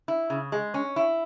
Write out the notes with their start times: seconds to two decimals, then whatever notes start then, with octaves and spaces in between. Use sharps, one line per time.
0.08 E4
0.30 C#3
0.52 G#3
0.74 C#4
0.96 E4